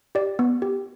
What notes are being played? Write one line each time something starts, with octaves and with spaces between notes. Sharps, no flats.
G4 D5
B3
G4